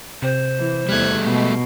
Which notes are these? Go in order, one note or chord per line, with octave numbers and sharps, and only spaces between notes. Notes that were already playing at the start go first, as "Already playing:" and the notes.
C3 C5
E3
E2 G3 A3 F#6 G#6
B2 G#3